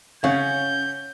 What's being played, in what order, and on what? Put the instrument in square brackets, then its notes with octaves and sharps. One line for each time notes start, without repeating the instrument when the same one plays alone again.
[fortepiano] C#3 [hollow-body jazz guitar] C#4 [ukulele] C#5 F5 F#5 [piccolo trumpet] G6